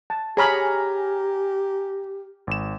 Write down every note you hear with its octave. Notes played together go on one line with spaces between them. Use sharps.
A5
G4 G#4 C#5 G#5 A#5 B5 F6
G#1 E7